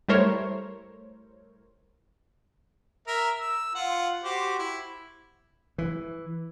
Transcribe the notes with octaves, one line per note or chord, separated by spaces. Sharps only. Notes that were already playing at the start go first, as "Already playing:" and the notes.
G3 A3 E4 A#4 C5 C#5
A#4 E5
E6
F4 F#5
F#4 G4 C5
E4
E3